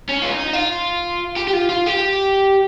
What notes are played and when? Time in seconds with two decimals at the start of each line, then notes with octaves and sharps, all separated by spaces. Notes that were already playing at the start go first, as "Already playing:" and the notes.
0.09 C#4
0.22 F4
0.32 D#4
0.53 F4
1.36 G4
1.47 G4
1.53 F4
1.69 F4
1.86 G4